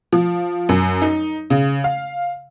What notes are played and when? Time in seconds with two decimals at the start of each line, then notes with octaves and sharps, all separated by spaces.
0.13 F3
0.69 F#2
1.02 D#4
1.50 C#3
1.84 F5